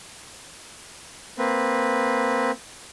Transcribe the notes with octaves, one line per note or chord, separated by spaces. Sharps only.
A#3 C4 B4